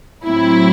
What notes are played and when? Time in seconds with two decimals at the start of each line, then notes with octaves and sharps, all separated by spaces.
0.25 A2 F#3 C4 E4